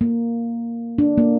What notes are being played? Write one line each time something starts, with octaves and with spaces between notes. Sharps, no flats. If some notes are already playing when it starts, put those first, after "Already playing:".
A#3
D4
A#3